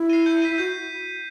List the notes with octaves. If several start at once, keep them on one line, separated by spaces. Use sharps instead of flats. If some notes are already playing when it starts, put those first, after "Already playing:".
Already playing: E4
C7 D#7
G6
B6 D#7
F#4 G6